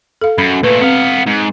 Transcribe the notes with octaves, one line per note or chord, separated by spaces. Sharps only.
A4 F5
F#2 B5
A#2 A3 B4
B3 C4 F5
G#2